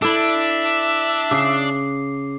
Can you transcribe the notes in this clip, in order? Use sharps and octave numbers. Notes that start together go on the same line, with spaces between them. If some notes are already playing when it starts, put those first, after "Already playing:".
D4 E4 A4 E5
C#3 D6 C7